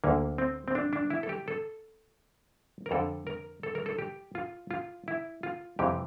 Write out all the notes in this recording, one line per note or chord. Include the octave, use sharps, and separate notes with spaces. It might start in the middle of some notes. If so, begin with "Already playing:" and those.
D2 D3 A#3
C4
C4
D4
D4
E4
A4
G4
A4
A#4
F2 D3 A4
A#4
A4
A#4
A4
G4
F4
F4
E4
F4
F2 C3 E3 G4